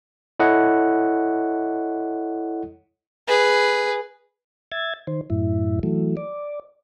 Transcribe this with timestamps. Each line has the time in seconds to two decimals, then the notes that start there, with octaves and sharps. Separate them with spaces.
0.40 E4 A4 C#5 D#5 F#5
3.28 G#4 B4
4.72 E5 G#6 A6
5.07 D#3 C5
5.30 F#2 A2 E4
5.83 E3 F#3 A3
6.17 D5